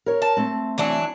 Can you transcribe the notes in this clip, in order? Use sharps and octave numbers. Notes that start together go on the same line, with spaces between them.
A#4 C#5
A5
A3 C4
E3 F#3 D4